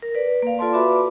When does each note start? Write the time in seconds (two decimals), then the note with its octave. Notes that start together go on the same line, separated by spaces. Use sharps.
0.02 A#4
0.15 B4 D5
0.42 A#3 F5
0.59 A#3 F4 A4 D5 A5 C6
0.73 F#4 B4 E5 B5 C6 D6